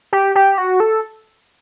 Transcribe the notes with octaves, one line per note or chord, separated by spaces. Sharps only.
G4
G4
F#4
A4